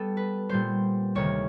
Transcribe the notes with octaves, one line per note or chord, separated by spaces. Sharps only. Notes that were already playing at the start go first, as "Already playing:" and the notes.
Already playing: G3 B3 A4
B4
A#2 G3 B3 C5
D2 C3 D#3 C#5